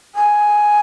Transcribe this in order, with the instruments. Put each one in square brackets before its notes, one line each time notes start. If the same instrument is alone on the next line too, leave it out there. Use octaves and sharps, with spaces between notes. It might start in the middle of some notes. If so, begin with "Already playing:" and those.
[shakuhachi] G#5